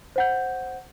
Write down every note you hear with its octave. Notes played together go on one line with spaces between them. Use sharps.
C5 F#5 G6